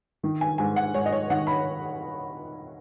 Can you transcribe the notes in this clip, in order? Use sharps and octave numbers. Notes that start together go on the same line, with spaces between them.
D#3
G#5
G#2 G#5
F#5
G#2 C#5
D#5
C#5
D#3 F#5
B5